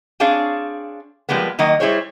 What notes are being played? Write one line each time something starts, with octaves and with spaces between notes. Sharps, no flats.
C4 D4 G#4 C#5 F5
F3 G3 G#3 A#3 B3
D#3 F#3 A#3 D#5
G3 E4 G#4 C5 C#5